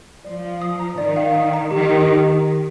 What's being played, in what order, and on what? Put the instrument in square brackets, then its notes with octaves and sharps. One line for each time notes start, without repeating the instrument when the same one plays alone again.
[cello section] F3 [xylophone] D5
[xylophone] F5
D#6
A#5
[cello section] D#3 [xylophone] D5
[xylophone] F5
D#6
A#5
[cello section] D#3 [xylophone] G4
[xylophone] A#4
G4